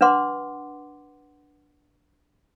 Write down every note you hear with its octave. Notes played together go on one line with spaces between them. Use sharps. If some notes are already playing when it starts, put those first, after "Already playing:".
D4 B4 F#5 C6 D6